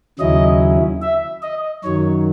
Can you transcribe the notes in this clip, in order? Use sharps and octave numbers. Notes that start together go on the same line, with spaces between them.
D#2 C#3 F#3 C#4 E4 D#5
E5
D#5
F#2 D#3 F#3 C#5